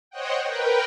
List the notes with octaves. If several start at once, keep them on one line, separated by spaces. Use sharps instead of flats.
C5 C#5 D#5 F#5 G5
A#4 B4 G5